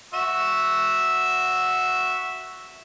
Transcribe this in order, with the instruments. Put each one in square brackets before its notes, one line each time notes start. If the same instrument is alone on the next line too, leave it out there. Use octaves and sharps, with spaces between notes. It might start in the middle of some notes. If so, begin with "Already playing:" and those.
[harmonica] F#4 E5 E6